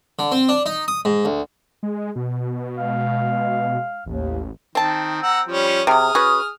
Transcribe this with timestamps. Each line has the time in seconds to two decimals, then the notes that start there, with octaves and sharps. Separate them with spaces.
0.19 D3
0.32 C4
0.49 D4
0.66 D#4
0.88 D#6
1.05 G#2
1.25 D2
1.83 G#3
2.16 B2
2.77 G#3 F5
4.06 A1 D#2
4.75 D#3 C4 A5
5.23 F#5 A#5 E6
5.48 F3 G3 C#4
5.87 C3 F#3 G#4 D#6 F6
6.15 C#4 F#4 B4